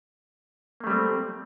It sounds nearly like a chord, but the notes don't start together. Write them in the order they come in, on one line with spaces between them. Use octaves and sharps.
A#3 A3 G3 C4